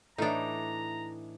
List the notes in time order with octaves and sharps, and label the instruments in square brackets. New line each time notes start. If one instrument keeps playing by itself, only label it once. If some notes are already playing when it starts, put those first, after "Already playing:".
[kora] A2 E3 [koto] D4 D#4 [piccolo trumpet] A#5